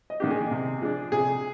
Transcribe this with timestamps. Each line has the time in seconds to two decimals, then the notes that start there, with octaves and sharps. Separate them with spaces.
0.10 D#5
0.20 D#3 A#3 D4 G4
0.31 G#4
0.51 C3
0.82 F3 G#3 D4
1.12 C3 G#4